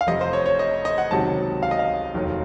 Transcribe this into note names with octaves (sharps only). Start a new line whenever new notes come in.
F5
F1 F2 C3 D#5
C5
C#5
C#5
D#5
D#5
F#5
C#2 C3 D#3 F#3 A5
F5
D#5
F5
F1 D#2 D#3 F#3